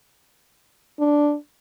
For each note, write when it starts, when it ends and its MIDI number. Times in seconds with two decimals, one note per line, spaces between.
0.99 1.35 62